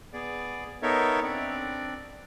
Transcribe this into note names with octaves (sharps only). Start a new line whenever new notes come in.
B3 G#4 D5
B3 D#4 A4 A#4 C#5 E5
C4 D4 D5